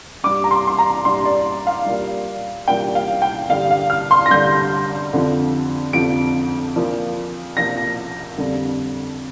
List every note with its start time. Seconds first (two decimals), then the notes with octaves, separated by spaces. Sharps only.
0.24 G2 G3 D6
0.44 A#5
0.51 C6
0.67 C6
0.78 A#5
1.05 G2 G3 C6
1.25 D5
1.67 F5
1.86 A#2 G3
2.68 A#2 G3 G5
2.95 F5
3.22 G5
3.49 G2 D3 G3 F5
3.71 F5
3.90 F6
4.11 C6
4.26 A#6
4.31 G2 D3 G3 G6
5.13 F2 D3 F3
5.93 F2 D3 F3 D7
6.76 A#2 F3
7.57 A#2 F3 A#6
8.38 F2 D3 G3